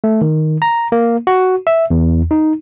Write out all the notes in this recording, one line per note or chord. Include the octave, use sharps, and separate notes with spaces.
A3
D#3
A#5
A#3
F#4
E5
E2
D#4